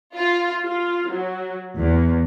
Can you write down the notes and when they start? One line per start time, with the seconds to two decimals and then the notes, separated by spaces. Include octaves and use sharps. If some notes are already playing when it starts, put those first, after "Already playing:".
0.17 F4
0.65 F4
1.10 F#3
1.78 E2